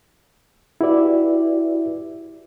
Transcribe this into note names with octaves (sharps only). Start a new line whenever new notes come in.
E4 F#4 G4 B4 D5 E5